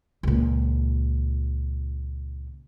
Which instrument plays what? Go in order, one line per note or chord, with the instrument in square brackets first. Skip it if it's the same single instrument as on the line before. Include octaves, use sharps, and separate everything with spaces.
[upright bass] C#2 A#2